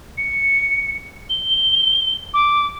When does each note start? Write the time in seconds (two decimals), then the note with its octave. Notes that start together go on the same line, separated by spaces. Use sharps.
0.18 C#7
1.30 G7
2.34 D6